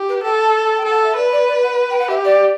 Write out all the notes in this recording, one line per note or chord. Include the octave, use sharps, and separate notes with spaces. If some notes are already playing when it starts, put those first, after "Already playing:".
Already playing: G4
B4
A4 G5
A5
A5
G5
A4 F#5
E5
B4 D5
D5
D5
F#5
G5
F#5
G4 E5
D5